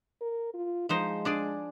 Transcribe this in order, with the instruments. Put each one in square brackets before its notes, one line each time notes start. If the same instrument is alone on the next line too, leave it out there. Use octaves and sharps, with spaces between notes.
[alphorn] A#4
F4
[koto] F3 D#4 C5 [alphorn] G#3
[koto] D4 G#4 D5